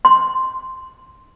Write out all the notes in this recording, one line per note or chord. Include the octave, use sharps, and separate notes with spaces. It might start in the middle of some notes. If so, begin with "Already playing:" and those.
C6